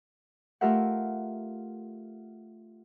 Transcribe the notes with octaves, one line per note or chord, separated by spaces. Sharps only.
A3 F4 G4 A#4 E5 F#5